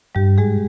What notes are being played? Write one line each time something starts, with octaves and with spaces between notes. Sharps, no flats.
G2 G3 G4
G#2 G#3 G#4